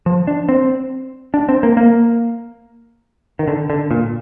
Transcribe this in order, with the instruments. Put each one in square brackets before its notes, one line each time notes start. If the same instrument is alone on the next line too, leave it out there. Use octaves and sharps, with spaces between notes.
[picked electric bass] F3
D4
C4
D4
C4
A#3
A#3
D#3
D3
D3
A#2